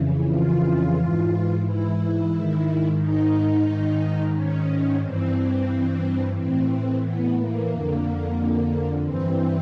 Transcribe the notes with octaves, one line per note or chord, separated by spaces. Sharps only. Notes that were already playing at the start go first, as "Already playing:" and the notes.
Already playing: F2 C#3 E3
F4
G#2 E3
E4
G#2 D#3
D#4
G#2 D#3
C#4
G2 E3 C4
A2 E3 C4
B3
A#3
F2 D3
G2 E3 C4